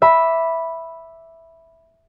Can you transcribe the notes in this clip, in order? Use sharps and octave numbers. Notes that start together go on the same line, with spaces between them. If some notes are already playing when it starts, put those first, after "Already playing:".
E5 B5 D6